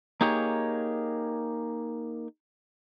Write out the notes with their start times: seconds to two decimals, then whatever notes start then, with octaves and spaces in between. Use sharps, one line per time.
0.21 A#3 D#4 G4 G#4 C#5